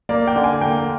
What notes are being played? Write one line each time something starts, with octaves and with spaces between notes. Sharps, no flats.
A#3 D5
G5
D3
G#5
A#3 G5